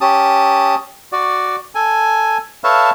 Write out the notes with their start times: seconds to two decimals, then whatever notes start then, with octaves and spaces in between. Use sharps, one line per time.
0.01 C#4 G4 A5 D#6
1.12 F#4 D5
1.75 A4 G#5
2.64 A4 B4 C#5 E5 F5 A5